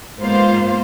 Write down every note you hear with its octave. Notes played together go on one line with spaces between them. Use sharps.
G#2 A#3 B3 F4 C5 F5